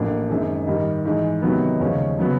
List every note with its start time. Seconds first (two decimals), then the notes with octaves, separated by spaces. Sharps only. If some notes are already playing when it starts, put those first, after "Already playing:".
Already playing: A1 A2 F3 A#3 D4
0.30 F#2 D#3 G#3 C4
0.67 G#2 D#3 G3
1.05 G#2 E3 G#3
1.42 C3 D#3 F#3 B3
1.80 D#2 C#3 F3 G#3 C#4
2.19 C#3 F#3 B3